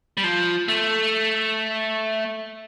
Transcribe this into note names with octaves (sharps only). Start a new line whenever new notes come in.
G3
F3
A3